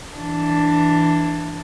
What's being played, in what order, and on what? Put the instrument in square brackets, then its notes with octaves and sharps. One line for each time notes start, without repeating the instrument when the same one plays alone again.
[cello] E3 D4